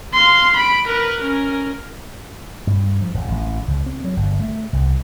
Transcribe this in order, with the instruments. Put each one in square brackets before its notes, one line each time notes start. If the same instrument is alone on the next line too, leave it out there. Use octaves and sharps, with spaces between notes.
[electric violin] F5 C6
B5 D7
A#4 B4
C#4 A#4
[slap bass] G2
F3
D#1
A1
C#2
C4
F#3
G1
A3
C2